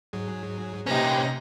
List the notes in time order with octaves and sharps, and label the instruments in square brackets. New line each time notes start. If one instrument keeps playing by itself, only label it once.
[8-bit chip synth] G#2 F#3 G#4
[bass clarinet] C3 [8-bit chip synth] A#3 B4 C5 [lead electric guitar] C#4 G4 [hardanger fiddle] D#4 A#5